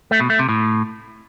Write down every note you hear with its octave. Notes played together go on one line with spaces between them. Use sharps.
A3
B2
A3
C3
A2